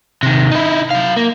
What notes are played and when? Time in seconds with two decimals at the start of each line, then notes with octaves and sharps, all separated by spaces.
0.23 C3 D#3
0.52 D#4 E4
0.91 F#3 F5
1.16 A#3